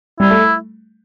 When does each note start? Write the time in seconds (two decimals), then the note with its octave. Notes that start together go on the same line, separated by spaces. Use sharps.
0.20 G3 E4
0.30 A3